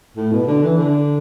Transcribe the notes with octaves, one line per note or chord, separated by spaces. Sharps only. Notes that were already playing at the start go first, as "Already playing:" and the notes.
A2
B2
D3
E3
D3